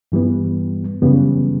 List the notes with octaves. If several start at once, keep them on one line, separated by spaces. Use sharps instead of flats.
G2 E3 G3 B3
F#2 C#3 E3 G3 B3